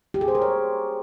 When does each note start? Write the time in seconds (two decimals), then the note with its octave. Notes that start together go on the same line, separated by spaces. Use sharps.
0.14 G4
0.21 G#4
0.28 C5
0.35 A#4
0.42 C#5